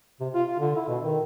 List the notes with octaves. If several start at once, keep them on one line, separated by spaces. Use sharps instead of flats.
C3
F4
F4
D3
E4
B2
D#3